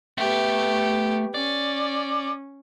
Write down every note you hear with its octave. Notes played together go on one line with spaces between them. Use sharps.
A3 B3 G4 E5
C#4 D5